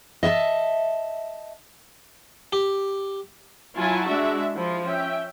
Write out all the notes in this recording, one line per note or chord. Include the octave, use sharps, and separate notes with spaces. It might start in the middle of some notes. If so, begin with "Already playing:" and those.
D#5 E5 G5 A5
G4
F#3 E4 F4 G#5 A5
G#3 D4 F#4 E5
F3 E4
C#4 E5 G5